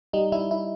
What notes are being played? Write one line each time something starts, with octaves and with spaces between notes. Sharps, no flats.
G3 D#4
G3 E4
E4